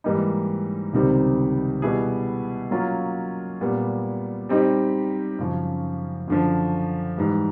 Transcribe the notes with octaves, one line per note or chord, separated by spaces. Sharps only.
G#2 E3 G3 A#3 D#4
C#2 C3 D#3 G3 C4
B2 G3 B3 E4 G#4
F#3 A#3 C#4 F4 A#4
A#2 G3 B3
G3 C4 D#4 G4
F#2 C#3 F3
F#2 D3 F3
G#2 E3 G3